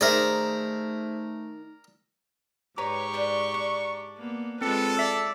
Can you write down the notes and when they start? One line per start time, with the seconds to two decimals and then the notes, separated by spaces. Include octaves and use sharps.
0.01 D#3 A3 D#4 G#4 A#4 C5 D5 E5
2.78 G#2 G4 B4 C#5 A#5 C#6
3.14 D4 B4 C5
3.54 D4
4.18 A#3 B3
4.61 G#3 C4 F4 A4 B4 C#7
4.97 D5 E5 E6